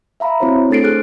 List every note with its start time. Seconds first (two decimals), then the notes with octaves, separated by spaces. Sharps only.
0.20 E5 F5 A#5 B5
0.40 C4 E4 F#4 C5 C#5
0.70 A3 D4 A4 A6 C7 D7
0.83 G#4 A4 C5 F6 F#6 D7